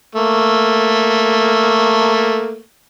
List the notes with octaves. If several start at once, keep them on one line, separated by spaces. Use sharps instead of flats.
A3 A#3